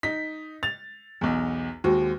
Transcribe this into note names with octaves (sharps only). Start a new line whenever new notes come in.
D#4 B6
A6 F7
B1 E2
D#2 G#3 F#4 C5